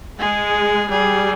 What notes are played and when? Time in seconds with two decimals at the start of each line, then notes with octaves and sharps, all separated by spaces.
0.19 G#3 G#4
0.91 G3 G#4